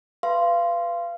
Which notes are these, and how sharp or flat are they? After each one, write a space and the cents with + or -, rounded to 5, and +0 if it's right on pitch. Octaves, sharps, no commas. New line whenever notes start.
B4 +0 F5 -25 C6 +0